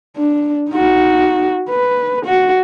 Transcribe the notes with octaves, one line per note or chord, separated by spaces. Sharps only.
D4
D#4 F#4
B4
F#4